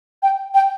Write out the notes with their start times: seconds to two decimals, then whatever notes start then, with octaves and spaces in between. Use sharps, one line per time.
0.23 G5
0.54 G5